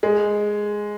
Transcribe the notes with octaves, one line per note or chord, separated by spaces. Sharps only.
G#3